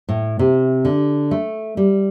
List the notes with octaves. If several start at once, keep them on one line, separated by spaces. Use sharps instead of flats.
A2
C3
D3
A3
G3